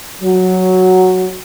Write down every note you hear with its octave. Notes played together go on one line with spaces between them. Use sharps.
F#3